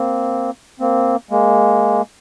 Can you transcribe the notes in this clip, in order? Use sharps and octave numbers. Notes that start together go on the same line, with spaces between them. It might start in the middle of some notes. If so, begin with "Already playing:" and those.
Already playing: A#3 C4
A#3 C4
G#3 A#3